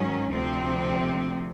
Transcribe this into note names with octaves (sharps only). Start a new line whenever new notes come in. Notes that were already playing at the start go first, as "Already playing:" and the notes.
Already playing: G#2 D#3 F#3 C#4
D2 C3 F3 C4